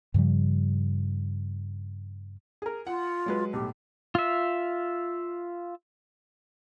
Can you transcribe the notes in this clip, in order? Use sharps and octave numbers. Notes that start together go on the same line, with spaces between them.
G2 C#3 F3 G3
G#4 A#4
F4 F#5
F#3 G#3 B4
B1 A2 G4
F4 E5